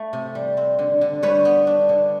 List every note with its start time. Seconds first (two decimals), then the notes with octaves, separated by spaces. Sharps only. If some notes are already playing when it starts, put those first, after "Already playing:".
Already playing: A3
0.13 C3
0.35 G3
0.57 C4
0.79 D3
1.01 D3
1.23 G3 B4 C#5
1.45 B3
1.67 D4
1.89 D3